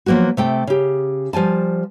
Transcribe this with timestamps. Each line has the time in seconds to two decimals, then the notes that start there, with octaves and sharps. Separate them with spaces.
0.06 F3 F#3 A#3 B3 F#4
0.37 C3 A3 G5
0.67 C#3 G4
1.33 F3 G3 G#5 A5